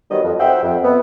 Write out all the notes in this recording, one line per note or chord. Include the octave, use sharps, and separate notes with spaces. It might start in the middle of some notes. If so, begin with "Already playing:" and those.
D#3 F#3 G3 B3 D#5
F2
C5 E5 F#5 G5
F2
B3